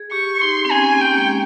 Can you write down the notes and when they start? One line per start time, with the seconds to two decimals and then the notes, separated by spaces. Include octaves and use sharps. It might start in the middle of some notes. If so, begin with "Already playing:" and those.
Already playing: G#4
0.12 G4 C#6
0.41 D#4 C6
0.65 C4
0.71 C#4 G#5
0.94 A#3
1.01 G5
1.17 G#3